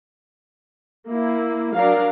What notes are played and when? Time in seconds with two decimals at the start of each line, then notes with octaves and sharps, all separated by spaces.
1.07 A#3 E4
1.74 F#3 D4 A#4 F5